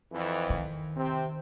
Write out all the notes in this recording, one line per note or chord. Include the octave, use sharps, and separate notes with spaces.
F2 E3
D#3
C3 C4